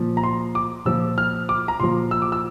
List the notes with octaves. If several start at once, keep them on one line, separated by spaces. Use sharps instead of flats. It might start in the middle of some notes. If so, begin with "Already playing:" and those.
Already playing: A#2 F3
A#5
C6
D6
A#2 F3 E6
F6
D6
A#5
A#2 F3 C6
E6
D6
E6